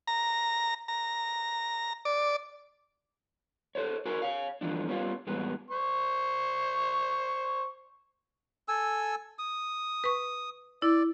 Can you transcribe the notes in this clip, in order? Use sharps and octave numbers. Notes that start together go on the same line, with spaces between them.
A#5
A#5
D5
A4 C5 C#5
F#4 A#4 C5 G#5
C#5 F5
G2 D3 E3 F3 D4
G3 B3 C#4 E4 F4
E2 A2 G3 G#3 B3
C5 C#6
A4 G#5 E6
D#6
B4 C#6
E4 D5